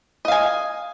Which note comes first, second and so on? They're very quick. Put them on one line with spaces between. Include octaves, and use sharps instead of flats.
D#5 F5 G#5